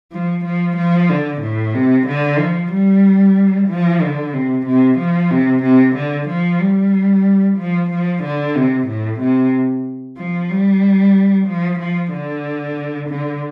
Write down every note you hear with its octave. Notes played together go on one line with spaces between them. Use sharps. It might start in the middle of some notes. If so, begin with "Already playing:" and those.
F3
F3
F3
D3
A2
C3
D3
F3
G3
F3
D3
C3
C3
F3
C3
C3
D3
F3
G3
F3
F3
D3
C3
A2
C3
F3
G3
F3
F3
D3
D3